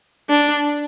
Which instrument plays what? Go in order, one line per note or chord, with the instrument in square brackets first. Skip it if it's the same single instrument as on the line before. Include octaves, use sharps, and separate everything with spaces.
[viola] D4